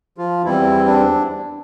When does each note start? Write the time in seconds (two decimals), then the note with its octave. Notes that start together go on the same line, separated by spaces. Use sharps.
0.18 F3 F4
0.45 E2 E3 G3 C4 E4
0.86 D4